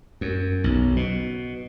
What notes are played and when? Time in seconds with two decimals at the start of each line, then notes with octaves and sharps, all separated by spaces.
0.21 F#2
0.64 B1
0.96 B2